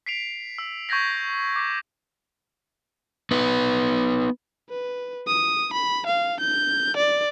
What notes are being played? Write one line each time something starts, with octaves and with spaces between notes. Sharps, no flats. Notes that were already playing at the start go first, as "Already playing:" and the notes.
B6 C7 D7 F7
E6
C#6 G6 G#6 A#6 B6
D6 B6
B3 D#4 B4
B4
D#6
B5
F5
G6
D5